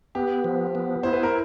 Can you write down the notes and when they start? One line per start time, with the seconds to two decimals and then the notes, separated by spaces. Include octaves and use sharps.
0.15 B3 G4
0.44 F3
0.75 B3
1.03 E4 C5
1.13 B4
1.23 A#4